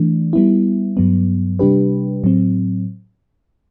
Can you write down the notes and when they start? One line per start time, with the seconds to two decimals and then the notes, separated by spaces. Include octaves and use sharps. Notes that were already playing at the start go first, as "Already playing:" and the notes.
Already playing: E3 A3 D4
0.33 G3 B3 E4
0.97 G2 F#3 B3
1.59 C3 G3 D4 G4 B4
2.24 A2 F#3 C4